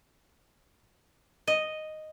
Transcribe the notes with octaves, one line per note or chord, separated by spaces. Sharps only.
D#5